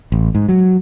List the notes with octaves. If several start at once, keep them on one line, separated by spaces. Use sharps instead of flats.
A1
G#2
F#3